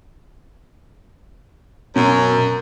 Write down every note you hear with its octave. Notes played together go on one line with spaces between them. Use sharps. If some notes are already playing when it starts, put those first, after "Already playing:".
F#2 B2 C#4